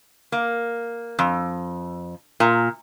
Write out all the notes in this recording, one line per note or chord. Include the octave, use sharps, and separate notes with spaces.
A#3
F2
A#2